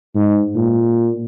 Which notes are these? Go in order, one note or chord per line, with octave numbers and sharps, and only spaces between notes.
G#2
A#2